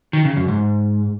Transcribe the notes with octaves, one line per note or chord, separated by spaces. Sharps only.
D#3
C#3
F#2
G#2